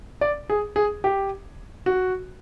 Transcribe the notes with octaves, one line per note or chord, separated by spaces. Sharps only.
D5
G#4
G#4
G4
F#4